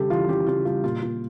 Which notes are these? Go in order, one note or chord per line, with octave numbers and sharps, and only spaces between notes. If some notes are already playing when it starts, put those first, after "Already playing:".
Already playing: C#3 G3 G4 A4
E3 F4
C#3 G4
C#3 F4
G3 F4
A#2 F4
A#2 F4